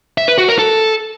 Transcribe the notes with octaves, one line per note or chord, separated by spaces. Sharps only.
E5
B4
F#4
A#4
A4